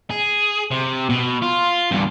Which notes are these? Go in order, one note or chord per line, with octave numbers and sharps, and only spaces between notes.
G#4
C3
B2
F4
E2 G2